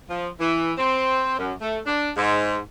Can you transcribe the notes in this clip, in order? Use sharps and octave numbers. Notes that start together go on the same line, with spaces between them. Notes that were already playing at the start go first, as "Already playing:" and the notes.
F3
E3
C4
F#2
A3
D4
G#2